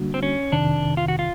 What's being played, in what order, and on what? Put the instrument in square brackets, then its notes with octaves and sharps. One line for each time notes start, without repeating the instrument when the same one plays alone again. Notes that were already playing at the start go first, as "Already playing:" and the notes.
Already playing: [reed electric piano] D3 G3 A#3 D4 F#4
[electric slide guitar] C4
C#4
[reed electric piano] F2 C3 D#3 [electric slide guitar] D4
[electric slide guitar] F4
F#4
F4